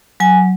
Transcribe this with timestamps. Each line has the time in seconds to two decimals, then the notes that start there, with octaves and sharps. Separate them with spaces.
0.20 F#3 G#5